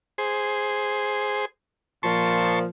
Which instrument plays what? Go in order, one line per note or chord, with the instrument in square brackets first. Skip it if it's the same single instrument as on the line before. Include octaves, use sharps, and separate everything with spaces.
[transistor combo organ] G#4 C5
[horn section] A#2 F3 [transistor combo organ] A5 C6 C#6